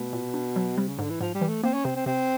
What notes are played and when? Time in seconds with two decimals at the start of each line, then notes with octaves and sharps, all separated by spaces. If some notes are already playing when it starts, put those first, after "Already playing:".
Already playing: B2 A3
0.13 A#2
0.34 D4
0.56 F#3
0.77 C3 G3
0.88 C#3
0.99 G#2 D3
1.10 E3
1.21 G#2 F3
1.34 G3
1.41 E3
1.48 A3
1.63 A#3 C4
1.74 C#4
1.85 C3 C4
1.96 C4
2.06 C3 C4